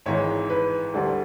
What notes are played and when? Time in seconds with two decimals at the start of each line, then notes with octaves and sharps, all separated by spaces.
0.06 G#1 G#2 E3 G#3 C#5
0.50 B4
0.94 D2 D3 G3